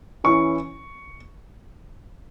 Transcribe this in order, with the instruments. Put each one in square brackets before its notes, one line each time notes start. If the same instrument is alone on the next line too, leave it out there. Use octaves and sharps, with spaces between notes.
[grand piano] E3 C#4 E4 C#6